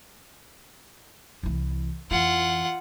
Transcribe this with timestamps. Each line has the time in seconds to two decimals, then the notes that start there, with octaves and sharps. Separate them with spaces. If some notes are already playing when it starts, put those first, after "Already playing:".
1.43 C2 E3
2.11 F2 E3 F4 F#5